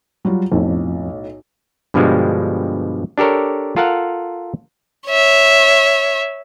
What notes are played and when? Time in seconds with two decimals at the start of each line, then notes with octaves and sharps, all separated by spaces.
0.25 F#3 G3 F4
0.52 B1 F2 A2
1.94 G2 B2 D3 F3 G3 G#3
3.18 D4 G4 A4 A#4 C#5
3.76 F4 A4 A#4 F5 F#5
5.08 C#5 E5